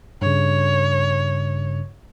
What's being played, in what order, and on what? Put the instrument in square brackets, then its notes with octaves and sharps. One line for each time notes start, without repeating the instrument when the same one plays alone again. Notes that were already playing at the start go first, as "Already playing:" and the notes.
[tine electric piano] G2 C#3 [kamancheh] C#5